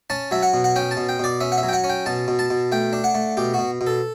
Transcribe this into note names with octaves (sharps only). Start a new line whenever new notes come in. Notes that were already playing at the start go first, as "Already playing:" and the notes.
C#4 A5
F#3 E5
F#5
B2
F#5
C#4 G5
A5
B2
G5
B2 D5
C#4 E5
F#5
E5
F#3
G5
F#5
C#4
G5
B2 A5
B2
A5
B2
A3 G5
D4
F#5
A3
B2 G4
B2 F#4
B2
A4